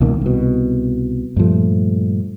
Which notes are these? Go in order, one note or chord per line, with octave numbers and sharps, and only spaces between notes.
C#2 B2 D#3 A#3
C2 B2
G2 A#2 F3 A3